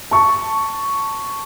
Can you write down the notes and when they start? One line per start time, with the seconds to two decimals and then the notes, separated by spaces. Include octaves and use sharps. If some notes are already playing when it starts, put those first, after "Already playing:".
0.11 A5 C#6